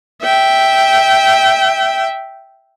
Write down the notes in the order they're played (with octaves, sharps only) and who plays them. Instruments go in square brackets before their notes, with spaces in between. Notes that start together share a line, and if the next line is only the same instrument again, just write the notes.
[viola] E5 G5